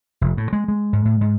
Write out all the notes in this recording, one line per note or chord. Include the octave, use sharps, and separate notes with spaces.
F1
A2
G#3
G#3
G#2
A2
G#2